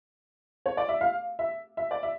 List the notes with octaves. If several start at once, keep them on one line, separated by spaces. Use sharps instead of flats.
C#5
D5
E5
F5
E5
E5
D5
E5